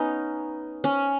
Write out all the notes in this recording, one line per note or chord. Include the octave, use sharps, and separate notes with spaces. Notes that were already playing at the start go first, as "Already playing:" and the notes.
Already playing: B3 C#4 D#4
C#4